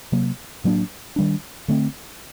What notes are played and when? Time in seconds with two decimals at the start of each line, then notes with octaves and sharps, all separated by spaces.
0.12 C3 F#3 A#3
0.64 A2 F#3 A#3 D4
1.16 D#3 G3 D4
1.68 D3 A3 C4